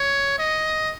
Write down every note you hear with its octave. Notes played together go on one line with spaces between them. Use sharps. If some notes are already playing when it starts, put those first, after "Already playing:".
Already playing: C#5
D#5